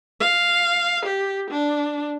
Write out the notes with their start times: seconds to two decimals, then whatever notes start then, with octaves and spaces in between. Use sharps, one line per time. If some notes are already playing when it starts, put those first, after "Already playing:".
0.20 F5
1.05 G4
1.50 D4